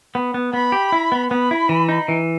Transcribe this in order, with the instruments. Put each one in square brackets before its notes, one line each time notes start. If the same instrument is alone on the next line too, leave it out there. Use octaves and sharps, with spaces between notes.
[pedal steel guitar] B3
B3
[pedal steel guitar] B3 [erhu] B5
[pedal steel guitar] G4
E4
B3
[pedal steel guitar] B3 [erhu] B5
[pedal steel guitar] E4
E3
D#4
E3